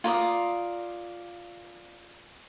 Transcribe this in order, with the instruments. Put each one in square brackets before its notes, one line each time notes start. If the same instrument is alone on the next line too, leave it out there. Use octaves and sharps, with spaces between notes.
[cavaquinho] F4 A#4 D5 D#6